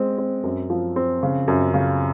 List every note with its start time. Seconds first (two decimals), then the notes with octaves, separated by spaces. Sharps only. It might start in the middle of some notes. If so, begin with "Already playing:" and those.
Already playing: G#3 C4
0.18 C4
0.43 F#2
0.70 F3
0.96 C4
1.23 C#3
1.48 F#2
1.74 C#3